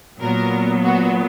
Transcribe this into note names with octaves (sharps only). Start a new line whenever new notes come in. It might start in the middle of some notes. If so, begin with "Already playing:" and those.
A#2 F#3 B3 A#4
F#4